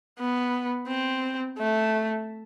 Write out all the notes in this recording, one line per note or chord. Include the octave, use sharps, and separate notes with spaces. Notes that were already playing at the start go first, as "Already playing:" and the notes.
B3
C4
A3